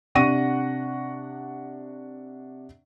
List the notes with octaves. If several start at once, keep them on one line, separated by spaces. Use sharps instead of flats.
C3 D4 F#5 C#6 A#6 D#7